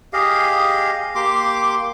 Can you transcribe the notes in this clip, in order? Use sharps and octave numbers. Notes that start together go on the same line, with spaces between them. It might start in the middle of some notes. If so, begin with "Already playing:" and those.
G4 G#4 D#5 F5
A#3 G4 C6 D6